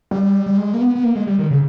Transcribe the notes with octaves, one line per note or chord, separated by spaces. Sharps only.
G3
G3
G#3
A#3
B3
B3
A#3
G#3
G3
D#3
C#3